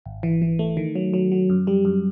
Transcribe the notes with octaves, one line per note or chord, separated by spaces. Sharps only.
G#1
E3
E3
A3
D#3
F#3
F#3
F#3
F#2
G3
F#2